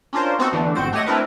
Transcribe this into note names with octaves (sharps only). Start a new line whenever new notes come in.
C#4 D4 F4 A#4 C5
B3 C4 D#4 F#4 A4
E2 D3 E3 A3 D4
G#1 F2 C4 F#4 C5 D7
A3 G4 C#5 D#5 F#5
A3 C4 D4 E4 A#4 B4